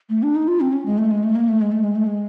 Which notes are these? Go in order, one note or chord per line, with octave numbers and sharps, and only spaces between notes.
A3
D4
D#4
F4
C4
C#4
G#3
A3
G#3
A3
A#3
A3
G#3
A3
G#3
A3
G#3